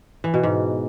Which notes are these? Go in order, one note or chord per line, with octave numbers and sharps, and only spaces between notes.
E3
B2
G#2